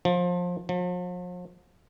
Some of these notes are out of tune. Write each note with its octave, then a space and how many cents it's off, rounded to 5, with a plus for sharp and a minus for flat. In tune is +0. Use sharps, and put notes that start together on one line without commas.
F3 +25
F3 +45